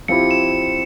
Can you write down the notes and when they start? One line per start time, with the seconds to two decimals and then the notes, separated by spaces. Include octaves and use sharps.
0.08 F3 C4 E4 G4 C#7
0.31 E7